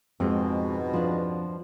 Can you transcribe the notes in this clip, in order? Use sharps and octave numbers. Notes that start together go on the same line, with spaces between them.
F2 G#2 B2 G#3 C4
F3 D4